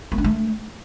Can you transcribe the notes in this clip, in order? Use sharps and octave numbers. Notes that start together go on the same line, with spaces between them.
A#3
D4
A3